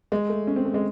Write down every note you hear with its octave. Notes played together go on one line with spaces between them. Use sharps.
G#3
A3
C#4
C4
A3
G#3